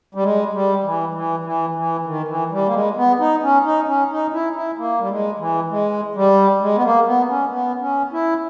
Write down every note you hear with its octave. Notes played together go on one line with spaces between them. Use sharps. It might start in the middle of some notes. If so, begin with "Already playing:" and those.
G3
G#3
G3
E3
E3
E3
E3
D#3
E3
G3
A#3
G#3
B3
D#4
C#4
D#4
C#4
D#4
E4
E4
A#3
G3
G#3
E3
G#3
G3
G#3
B3
A#3
B3
C#4
B3
C#4
E4